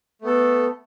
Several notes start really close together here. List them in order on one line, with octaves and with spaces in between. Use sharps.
A3 B3 A4